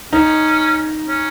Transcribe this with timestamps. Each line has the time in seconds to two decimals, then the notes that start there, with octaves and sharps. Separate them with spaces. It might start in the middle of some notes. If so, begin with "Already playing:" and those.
0.13 C#4 D#4
1.08 C#4